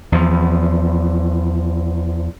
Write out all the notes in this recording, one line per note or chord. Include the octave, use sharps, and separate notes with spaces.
E2 F3